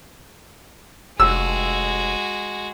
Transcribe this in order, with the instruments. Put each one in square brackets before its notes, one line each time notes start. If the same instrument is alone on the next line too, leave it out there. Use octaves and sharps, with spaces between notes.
[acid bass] F1 [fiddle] G#3 F#4 [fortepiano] E6